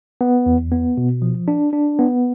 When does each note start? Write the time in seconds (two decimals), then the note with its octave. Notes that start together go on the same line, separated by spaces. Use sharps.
0.21 B3
0.46 E2
0.72 B3
0.97 B2
1.22 F3
1.48 D4
1.73 D4
1.99 B3